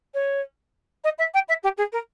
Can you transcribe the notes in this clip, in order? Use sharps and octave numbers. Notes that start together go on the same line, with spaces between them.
C#5
D#5
E5
G5
E5
G4
G#4
A#4